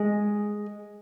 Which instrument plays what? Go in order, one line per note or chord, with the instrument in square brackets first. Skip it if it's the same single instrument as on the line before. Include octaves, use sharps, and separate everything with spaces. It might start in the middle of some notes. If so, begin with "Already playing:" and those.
Already playing: [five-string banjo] G#3